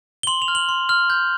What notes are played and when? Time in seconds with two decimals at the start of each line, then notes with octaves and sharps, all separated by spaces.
0.23 G7
0.27 C6 F#7
0.42 F7
0.48 F6
0.55 F#7
0.69 C6
0.89 F6
1.10 G6